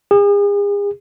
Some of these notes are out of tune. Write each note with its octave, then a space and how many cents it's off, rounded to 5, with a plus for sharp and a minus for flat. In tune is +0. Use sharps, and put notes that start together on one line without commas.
G#4 -40